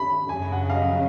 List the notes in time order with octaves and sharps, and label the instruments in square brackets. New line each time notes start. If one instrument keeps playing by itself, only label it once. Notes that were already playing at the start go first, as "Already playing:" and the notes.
Already playing: [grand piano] B5
[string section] F#2 C#3 F#3 [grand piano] G#5
[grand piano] F#5
F5
D#5